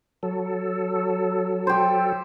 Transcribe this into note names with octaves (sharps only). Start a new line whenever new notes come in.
F#3 A4
G4 C5